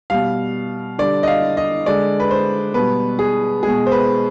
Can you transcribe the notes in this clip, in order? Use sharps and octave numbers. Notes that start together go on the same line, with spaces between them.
B2 G3 F5
D3 G3 D5
D#5
F5
D#5
D3 G#3 D5
B4
C5
B2 G3 B4
G#4
B2 G#3 G#4
C5
B4